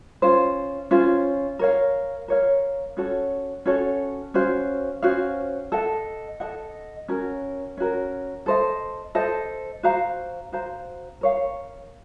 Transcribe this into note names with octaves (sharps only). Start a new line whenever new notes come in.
C#4 F4 C5
C#4 F4 C5
A#4 C#5 F5
A#4 C#5 F5
C#4 F#4 A4 C#5
C#4 F#4 A4 C#5
C#4 F#4 C5 F5
C#4 F#4 C5 F5
A4 D#5 F#5
A4 D#5 F#5
C#4 F#4 A#4
C#4 F#4 A#4
A4 C5 D#5
A4 C5 D#5
F#4 C5 F5 A#5
F#4 C5 F5 A#5
A#4 C#5 F5